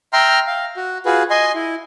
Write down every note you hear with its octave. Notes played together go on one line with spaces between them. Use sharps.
E5 G5 A#5 C6 F6
F5
F#4
F4 F#4 G#4 B4
D#5 G#5 C6
E4